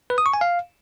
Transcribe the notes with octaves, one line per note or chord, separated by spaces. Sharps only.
B4
D#6
C#6
G#5
F5